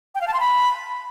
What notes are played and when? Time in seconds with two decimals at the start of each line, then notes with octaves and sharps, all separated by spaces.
0.15 G5
0.21 F5
0.27 A5
0.34 C6
0.40 B5